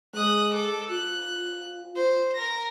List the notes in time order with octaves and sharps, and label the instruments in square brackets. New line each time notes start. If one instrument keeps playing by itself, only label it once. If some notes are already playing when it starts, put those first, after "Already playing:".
[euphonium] G#3 [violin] D#6 F#6
[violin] A4 D6
[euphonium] F4 [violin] F#6
[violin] C5
A#4 A#6